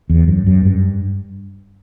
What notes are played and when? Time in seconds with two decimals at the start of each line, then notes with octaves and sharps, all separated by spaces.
0.10 E2
0.28 F#2
0.47 F#2
0.65 G2